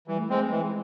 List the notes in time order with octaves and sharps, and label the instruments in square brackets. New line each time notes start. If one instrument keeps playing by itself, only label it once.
[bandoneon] E3 [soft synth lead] G3
[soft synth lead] A3
[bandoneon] G#3 C4 [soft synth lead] A3
[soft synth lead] G#3
[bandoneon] E3